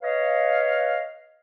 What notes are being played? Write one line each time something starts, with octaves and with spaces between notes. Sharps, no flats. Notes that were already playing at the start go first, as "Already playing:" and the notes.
B4 C#5 D#5 F5